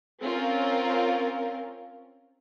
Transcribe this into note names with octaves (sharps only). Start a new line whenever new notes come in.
C4 C#4 F4 A#4